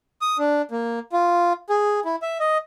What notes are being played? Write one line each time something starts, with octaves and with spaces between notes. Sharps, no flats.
D#6
D4
A#3
F4
G#4
E4
E5
D#5